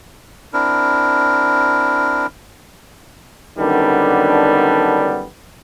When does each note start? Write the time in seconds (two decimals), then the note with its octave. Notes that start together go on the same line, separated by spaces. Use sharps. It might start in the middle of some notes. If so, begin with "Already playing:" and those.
0.53 C4 D4 E4 A#4
3.59 F#2 D3 D#3 G3 B3 D4